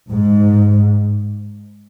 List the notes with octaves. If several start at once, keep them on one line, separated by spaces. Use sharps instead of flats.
G#2